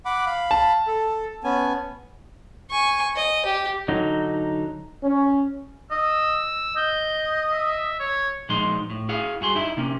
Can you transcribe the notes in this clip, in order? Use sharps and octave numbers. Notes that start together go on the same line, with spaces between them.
F#5 B5 D6
F5 B5
A5
A4
B3 C#4 G#5
G#5 C#6
D#5
G4
D3 F#3 D#4
C#4
D#5 E6
D#5 G6
E5
C#5
A#2 F3 G#3 B3 D#4 C6
A2
E4 G#4 F5 F#5
G2 F#4 G#4 C6
D#4 E4 E5
C3 A#3 C#4